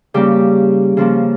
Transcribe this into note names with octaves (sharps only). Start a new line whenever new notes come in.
C#3 G3 A#3 G4
C#3 F3 A#3